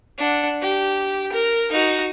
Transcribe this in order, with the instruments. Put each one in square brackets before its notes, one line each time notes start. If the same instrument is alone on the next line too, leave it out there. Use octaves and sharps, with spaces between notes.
[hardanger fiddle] D4 F#5
G4
A#4
D#4 F#4